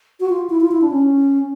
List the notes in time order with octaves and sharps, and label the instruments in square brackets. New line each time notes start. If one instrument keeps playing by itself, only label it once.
[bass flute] F#4
F4
E4
F4
E4
D4
C#4